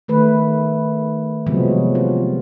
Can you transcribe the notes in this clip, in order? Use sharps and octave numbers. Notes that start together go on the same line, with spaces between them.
D#3 A3 B4
C3 F3 F#3 G#3 B3
F4